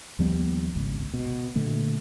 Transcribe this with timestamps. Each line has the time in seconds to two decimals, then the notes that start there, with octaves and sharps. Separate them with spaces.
0.19 D#2 F3 G3 B3
0.75 G#1 C#2
1.14 B2
1.56 A#2 D3 A3